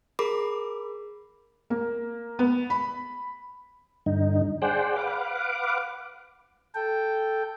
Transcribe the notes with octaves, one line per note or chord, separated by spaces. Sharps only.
G#4 A#4 B5 D6
A#3
B3
B5
G2 D3 D#4
G#4 C5 D5 F#5 G5
B4 F5 F#5 D6
A4 G5